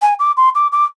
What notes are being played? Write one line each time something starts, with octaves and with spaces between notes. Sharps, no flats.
G#5
D6
C6
D6
D6